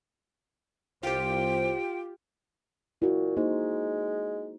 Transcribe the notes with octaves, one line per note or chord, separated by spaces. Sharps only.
C2 F4 G4 C5 G5
A#2 E4 F#4
G#3 A#3 D#4 C5